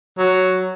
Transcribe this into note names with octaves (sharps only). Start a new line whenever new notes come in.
F#3